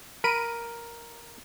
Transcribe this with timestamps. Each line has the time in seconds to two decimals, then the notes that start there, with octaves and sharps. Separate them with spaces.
0.24 A#4 B5 D7 D#7